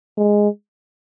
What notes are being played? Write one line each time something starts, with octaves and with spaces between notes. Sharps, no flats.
G#3